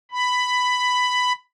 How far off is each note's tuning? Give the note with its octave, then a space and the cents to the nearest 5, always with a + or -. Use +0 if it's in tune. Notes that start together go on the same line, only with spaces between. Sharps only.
B5 +10